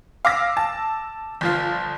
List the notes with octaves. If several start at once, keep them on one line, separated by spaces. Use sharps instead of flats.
F5 D6 E6 A#6
A5
G1 F3 F4